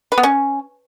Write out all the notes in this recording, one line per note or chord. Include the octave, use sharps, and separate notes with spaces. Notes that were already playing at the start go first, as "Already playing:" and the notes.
B4
B3
C#4